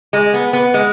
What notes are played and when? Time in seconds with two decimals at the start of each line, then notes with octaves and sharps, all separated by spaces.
0.13 G#3
0.34 B3
0.53 B3
0.74 G#3